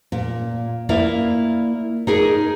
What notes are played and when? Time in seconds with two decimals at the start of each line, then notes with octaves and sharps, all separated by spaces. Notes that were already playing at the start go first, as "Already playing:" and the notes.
0.12 A#2
0.89 A#3 E4 D5 E5 F5
2.07 D#4 G#4 A#4